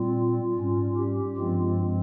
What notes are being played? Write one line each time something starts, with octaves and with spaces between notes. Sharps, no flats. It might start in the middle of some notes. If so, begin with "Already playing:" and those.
Already playing: A#2 G3 C4 F4
G#2 G3 C#4
G4
G2 F3 G#3 C4 F4